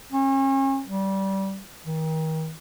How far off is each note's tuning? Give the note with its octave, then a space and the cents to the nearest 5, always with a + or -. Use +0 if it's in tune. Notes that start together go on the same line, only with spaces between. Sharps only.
C#4 -40
G3 -20
D#3 +35